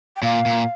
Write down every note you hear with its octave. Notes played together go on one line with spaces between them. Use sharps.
G5
A#2 F5
A#2